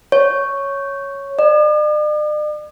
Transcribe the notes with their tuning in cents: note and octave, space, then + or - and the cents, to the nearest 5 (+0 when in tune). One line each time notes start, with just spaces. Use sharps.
C#5 +0
D5 +45